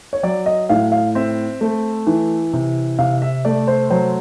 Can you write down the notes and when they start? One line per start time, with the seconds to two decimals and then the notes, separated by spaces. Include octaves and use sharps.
0.13 C#5
0.23 F#3 D5
0.46 D#5
0.69 A2 F5
0.92 F5
1.15 C4 E5
1.61 A3
2.07 E3
2.53 C3
2.99 C3 F5
3.22 E5
3.45 A3 D5
3.67 C5
3.90 F#3 C5